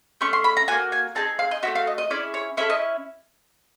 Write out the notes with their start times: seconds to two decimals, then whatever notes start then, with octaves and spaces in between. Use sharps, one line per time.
0.21 A3 C#4 C#6
0.33 C6
0.44 B5
0.57 A#5
0.68 A#3 C#4 F#4 G#5
0.92 G#5
1.15 C4 D#4 G#4 A5
1.39 F5
1.51 D#5
1.63 A3 C#4 F#4 E5
1.75 F5
1.87 D#5
1.98 D#5
2.10 C#4 E4 G#4 D5
2.34 C#5
2.57 C#4 E4 A4 E5
2.70 D#5